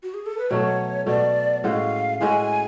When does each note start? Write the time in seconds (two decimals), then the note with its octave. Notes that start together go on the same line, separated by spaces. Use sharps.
0.03 F#4
0.14 G#4
0.26 A4
0.38 B4
0.50 B2 F#3 A3 C#5
1.06 B2 F#3 A3 D5
1.63 A2 G#3 C#4 F#4 F5 F#5
2.21 A2 G#3 C#4 F#4 G#5